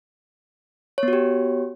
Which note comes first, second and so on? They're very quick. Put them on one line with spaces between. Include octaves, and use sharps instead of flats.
C#5 B3 F#4 G4